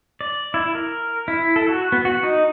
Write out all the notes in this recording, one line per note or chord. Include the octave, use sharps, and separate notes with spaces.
D5
E4
A#4
E4
A4
F#4
B3
F#4
D#4